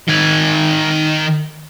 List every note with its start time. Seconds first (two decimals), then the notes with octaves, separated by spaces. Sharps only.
0.08 D#3 G#5